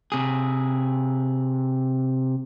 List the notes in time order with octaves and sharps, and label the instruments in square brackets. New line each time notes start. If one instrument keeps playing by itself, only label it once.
[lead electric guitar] C3 G#4